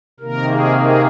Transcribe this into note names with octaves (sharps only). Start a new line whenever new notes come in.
C3 D#3 A#3 A#4
G#4
G#4